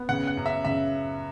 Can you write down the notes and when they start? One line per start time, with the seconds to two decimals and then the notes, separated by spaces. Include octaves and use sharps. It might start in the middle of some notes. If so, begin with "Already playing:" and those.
Already playing: B3
0.09 C#3 F#5
0.27 F#5
0.37 F#2
0.46 E5
0.65 C#3 E5